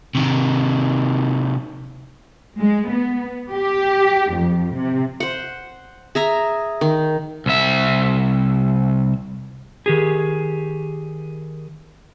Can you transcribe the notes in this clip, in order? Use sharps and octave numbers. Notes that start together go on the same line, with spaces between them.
C3 D#3
G#3
B3
G4
F2
C3
C5 F#5
G#4 E5 A#5
D#3
C2 E5
D#3 G4 G#4